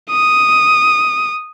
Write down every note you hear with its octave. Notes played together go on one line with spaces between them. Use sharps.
D#6